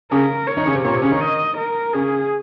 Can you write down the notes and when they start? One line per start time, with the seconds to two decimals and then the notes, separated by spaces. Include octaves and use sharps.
0.11 C#3 C#4 A#4
0.47 C#5
0.57 D#3 D#4
0.66 C#3 C#4
0.75 C3 C4
0.84 A#2 A#3 C#5
0.93 C3 C4
1.02 C#3 C#4
1.12 D#3 D#4
1.21 D#5
1.58 A#4
1.94 C#3 C#4 G#4